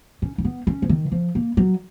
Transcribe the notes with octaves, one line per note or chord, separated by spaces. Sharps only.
C#4
C#4
B3
C#4
F3
D#3
F3
A#3
F#3